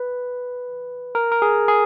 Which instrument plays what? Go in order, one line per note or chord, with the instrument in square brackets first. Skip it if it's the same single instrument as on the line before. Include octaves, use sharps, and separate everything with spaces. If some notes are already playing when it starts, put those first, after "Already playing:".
Already playing: [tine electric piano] B4
A#4
A#4
G#4
G#4